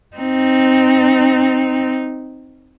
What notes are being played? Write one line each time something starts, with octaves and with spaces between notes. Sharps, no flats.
C4 D#4